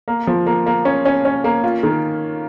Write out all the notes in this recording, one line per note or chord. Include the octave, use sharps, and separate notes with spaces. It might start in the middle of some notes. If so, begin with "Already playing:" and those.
A#3
F3
A#3
A#3
C#4
C#4
C#4
A#3
F4
D#3